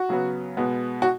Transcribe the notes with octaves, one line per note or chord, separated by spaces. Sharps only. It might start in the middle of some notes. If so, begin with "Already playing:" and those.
Already playing: F#4
C#3 F#3 B3
B2 G#3 B3
F#4